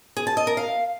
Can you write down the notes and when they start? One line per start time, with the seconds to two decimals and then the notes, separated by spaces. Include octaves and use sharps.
0.16 G#4
0.27 A5
0.37 D#5
0.47 A#4
0.57 F5